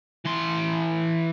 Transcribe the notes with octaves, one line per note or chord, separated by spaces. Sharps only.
E3 C6